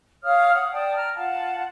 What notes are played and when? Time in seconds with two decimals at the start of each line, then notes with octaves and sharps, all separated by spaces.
0.24 C#5 F5 D#6 F6
0.54 F#5 D#6
0.73 D5 G5 A5 D#6
0.97 A#5 F6
1.16 F4 F5 F#5 A5